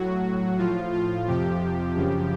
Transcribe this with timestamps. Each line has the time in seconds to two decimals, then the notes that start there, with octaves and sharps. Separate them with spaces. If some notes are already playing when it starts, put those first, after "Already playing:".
Already playing: A2 F#3 F#4
0.58 A2 F3 F4
0.93 F4
1.27 F2 C3 F3 G4
1.95 F#2 C#3 F3